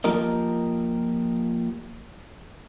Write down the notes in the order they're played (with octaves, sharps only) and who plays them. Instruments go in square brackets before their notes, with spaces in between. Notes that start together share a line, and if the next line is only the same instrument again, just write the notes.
[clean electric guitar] F3 A#3 F4 G4 A#4 D#5